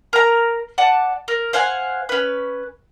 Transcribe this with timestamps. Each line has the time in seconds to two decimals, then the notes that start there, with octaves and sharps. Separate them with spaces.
0.13 A#4 A#5
0.78 D5 F#5 A5
1.28 A#4
1.53 C5 F5 F#5 G#5
2.09 C#4 B4